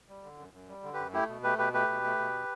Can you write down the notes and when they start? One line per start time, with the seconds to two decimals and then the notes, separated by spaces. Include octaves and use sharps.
0.08 G3
0.23 D3
0.38 F#2
0.53 F#2
0.69 G3
0.84 D3
0.93 G4 B4
0.99 F#2
1.13 A3 E4 G4
1.29 B2
1.44 A3 G4 B4
1.58 B2 G4 B4
1.74 A3 G4 B4
1.89 B2
2.04 A3
2.19 B2